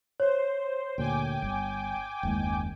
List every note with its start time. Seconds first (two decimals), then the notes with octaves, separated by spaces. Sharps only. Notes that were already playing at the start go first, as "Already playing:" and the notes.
0.20 C5 C#5
0.98 D2 A#2 G5 G#5 D6
1.42 G1
2.23 F#1 D#2 G#3